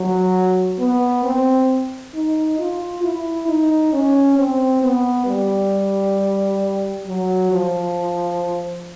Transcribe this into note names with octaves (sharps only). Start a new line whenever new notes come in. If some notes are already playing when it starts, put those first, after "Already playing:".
Already playing: F#3
B3
C4
D#4
F4
E4
D#4
C#4
C4
B3
G3
F#3
F3